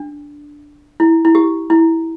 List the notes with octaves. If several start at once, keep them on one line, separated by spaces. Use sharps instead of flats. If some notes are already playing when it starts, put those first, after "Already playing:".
Already playing: D4
E4
E4
G4
E4